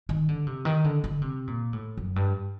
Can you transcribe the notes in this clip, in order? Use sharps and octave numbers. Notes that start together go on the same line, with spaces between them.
D#3
D3
C3
D#3
D3
D3
C3
A#2
A2
F#2
G2